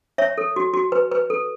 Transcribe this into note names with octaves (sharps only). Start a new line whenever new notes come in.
C#5 E5
A4
F#4
F#4
B4
B4
A4